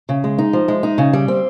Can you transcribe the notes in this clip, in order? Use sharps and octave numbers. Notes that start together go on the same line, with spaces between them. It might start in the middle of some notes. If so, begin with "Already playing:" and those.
C#3
G#3
D#4
F3
G#3
D#4
C#3
G3
C4